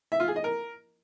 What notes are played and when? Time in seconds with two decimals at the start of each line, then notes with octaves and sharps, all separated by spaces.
0.12 E5
0.20 F4
0.28 G#4
0.36 D#5
0.44 A#4